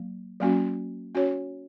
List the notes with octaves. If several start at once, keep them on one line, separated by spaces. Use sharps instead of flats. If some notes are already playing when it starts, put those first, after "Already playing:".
Already playing: F#3 A#3
F#3 A#3 C#4 F#4
C#4 F#4 C#5